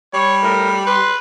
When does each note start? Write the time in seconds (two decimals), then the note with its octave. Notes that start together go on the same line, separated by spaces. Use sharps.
0.14 G3 C#5
0.43 A2 A#4
0.87 B4 C6